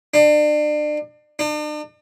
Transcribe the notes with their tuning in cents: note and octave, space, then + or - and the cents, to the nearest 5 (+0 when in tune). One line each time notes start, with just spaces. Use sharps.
D4 +35
D4 +45